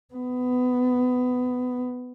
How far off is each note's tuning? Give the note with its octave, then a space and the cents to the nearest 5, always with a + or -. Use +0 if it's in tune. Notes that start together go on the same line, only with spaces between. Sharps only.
B3 +20